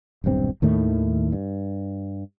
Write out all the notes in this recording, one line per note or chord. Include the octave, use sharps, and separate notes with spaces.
D#1 B1 G2 C4
D#2 A2 D#3 A3
G2